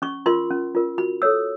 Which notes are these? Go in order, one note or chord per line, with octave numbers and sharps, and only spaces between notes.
C#4 C#6
F4 A#4 C6
C#4
F4 A#4
F#4 B5
A4 C#5 E6